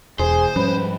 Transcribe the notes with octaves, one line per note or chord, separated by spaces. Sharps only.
E1 E2 G#4 C5
G#2 F3 G3 C#4 B4